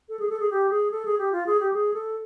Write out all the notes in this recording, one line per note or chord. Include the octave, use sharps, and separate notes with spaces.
A4
G#4
A4
G#4
G4
G#4
A4
G#4
G4
F4
G#4
G4
G#4
A4